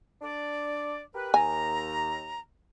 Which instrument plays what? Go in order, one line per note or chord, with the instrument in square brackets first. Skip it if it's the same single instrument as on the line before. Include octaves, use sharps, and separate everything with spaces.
[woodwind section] D4 D5
G4 A#4 B4
[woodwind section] D#2 A#5 [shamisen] G#5